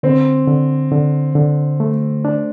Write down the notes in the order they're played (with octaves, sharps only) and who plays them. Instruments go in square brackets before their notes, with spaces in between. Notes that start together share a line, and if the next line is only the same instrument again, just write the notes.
[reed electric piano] D3 [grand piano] C4
[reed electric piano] D3
D3
D3
A3
D4